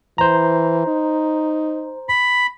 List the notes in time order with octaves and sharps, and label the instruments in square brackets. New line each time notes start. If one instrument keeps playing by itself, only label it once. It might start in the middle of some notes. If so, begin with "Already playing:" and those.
[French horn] E3 [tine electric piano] C5 A#5
[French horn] D#4
[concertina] B5